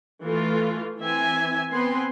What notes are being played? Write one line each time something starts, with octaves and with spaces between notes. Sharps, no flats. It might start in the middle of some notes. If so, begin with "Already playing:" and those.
E3 A3 F4
E3 C4 E5 G#5
B3 C4 B4 G#5 C6